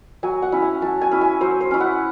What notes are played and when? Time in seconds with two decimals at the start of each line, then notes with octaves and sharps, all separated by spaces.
0.23 F#3 G#5
0.42 F#5
0.52 C#4 E4
0.62 G#5
0.82 F#3 A5
1.01 G#5
1.11 C#4 E4
1.21 G#5
1.41 F#3 C5
1.61 C5
1.71 C#4 E4
1.80 F#5